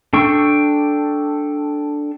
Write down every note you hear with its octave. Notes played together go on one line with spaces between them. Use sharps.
D4 A4 G5 C#6